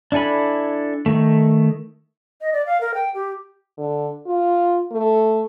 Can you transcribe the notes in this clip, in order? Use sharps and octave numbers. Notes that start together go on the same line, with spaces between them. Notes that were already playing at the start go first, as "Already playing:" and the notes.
D4 E4 A4 G#5 B5
D#3 A3
D#5
D5
F5
A#4
G5
G4
D3
F4
A3